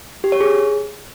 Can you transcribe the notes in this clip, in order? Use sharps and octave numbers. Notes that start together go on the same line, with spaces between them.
G4
C#5
G#4